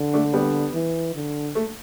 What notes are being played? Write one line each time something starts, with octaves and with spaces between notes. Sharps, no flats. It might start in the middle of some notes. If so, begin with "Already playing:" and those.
Already playing: D3
A3 D4
G3 B3
E3
D3
A3